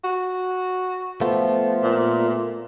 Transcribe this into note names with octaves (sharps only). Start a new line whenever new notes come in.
F#4
F3 A3 B3
A#2